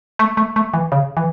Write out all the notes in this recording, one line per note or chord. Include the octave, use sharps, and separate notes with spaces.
A3
A3
A3
E3
C#3
E3